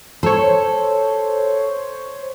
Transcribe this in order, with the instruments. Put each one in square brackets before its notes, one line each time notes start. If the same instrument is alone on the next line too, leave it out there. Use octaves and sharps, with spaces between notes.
[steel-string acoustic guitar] A4 [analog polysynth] C5 C#5